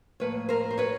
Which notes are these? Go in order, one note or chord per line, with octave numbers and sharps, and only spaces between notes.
A2 F3 A#3 B4 C#5
A#4 C5
C5
B4 C#5